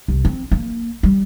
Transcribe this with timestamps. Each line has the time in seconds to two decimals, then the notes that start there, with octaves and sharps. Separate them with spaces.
0.08 C2
0.25 C4
0.52 A#3
1.03 G3